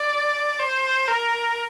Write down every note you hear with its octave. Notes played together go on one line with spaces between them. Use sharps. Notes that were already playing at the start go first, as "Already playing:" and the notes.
Already playing: D5
C5
A#4